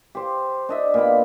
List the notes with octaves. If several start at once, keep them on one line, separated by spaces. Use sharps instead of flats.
G4 C5
D4 D#5 E5
A#2 B3 B5